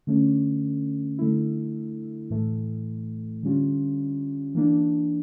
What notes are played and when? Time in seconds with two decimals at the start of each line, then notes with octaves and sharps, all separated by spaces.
0.07 D3 A3 C#4
1.18 D3 A3 E4
2.30 A2 E3 A3
3.43 D3 G3 C#4 F4
4.55 E3 A#3 D4